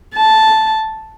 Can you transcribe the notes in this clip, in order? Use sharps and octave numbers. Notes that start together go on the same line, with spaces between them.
A5